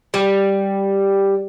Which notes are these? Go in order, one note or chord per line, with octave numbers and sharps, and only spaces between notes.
G3